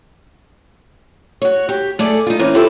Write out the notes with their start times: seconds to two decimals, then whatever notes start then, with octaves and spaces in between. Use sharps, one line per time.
1.42 F#4 C#5
1.69 G4
1.99 A3 G#4 A4 D5
2.27 D#4 F4
2.39 E3 A#3 C4 C#4
2.54 E4 F4 G4 A4 C5